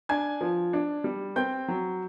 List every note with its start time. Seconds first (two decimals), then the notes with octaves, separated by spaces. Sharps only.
0.09 D4 G#5 G#6
0.41 F3
0.73 D4
1.04 G3
1.36 C4 G5 G6
1.68 F#3